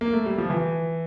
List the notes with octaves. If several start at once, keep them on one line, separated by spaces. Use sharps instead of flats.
A#3
A3
G3
F3
E3